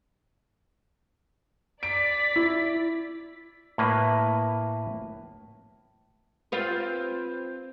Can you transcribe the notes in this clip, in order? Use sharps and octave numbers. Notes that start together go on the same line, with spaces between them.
D5 A6 B6 D7
E4
A2 A#3 B4
C4 F4 B4